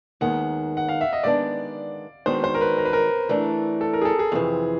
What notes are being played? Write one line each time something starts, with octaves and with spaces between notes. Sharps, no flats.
D#2 D#3 G#3 B3 F#5
F#5
F5
E5
D#5
D#3 G#3 B3 D4 D5
D#3 G#3 B3 D4 F#4 C5
C5
A#4
B4
A#4
B4
A#4
E3 A3 D4
A4
A#4
G#4
A4
G#4
F2 C3 E3